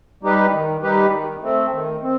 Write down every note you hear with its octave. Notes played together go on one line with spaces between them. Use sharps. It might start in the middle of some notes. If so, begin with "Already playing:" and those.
G3 D#4 G4 B4
D#3
G3 D#4 G4 B4
D#3
A3 C4
D#3
C4